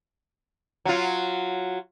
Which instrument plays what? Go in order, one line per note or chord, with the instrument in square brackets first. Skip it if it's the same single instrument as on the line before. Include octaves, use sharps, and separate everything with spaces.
[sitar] F#3 F4